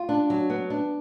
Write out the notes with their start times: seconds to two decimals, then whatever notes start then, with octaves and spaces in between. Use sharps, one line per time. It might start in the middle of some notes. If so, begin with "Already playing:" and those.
Already playing: F4
0.09 D4
0.30 F#3
0.50 B3
0.70 D4